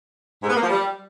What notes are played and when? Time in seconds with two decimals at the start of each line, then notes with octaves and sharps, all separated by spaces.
0.43 G#2
0.49 B3
0.56 A#3
0.63 F3
0.70 G3